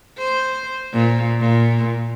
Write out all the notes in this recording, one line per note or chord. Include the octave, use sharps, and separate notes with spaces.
C5
A#2
A#2